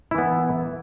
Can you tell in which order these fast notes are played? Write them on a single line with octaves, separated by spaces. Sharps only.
E4 E3 B3